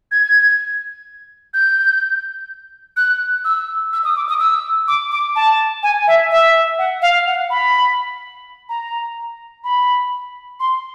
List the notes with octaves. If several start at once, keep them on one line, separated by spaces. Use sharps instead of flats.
G#6
G6
F#6
E6
E6
D#6
D6
D#6
E6
D6
D6
A5
G#5
E5
E5
F#5
F5
F#5
B5
A#5
B5
C6